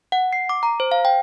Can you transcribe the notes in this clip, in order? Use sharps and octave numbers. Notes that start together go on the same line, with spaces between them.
F#5
C7
D6
A#5
C5
F5
G5